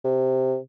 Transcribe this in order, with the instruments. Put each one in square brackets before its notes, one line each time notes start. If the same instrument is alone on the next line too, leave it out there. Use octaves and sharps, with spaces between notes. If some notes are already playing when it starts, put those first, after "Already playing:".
[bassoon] C3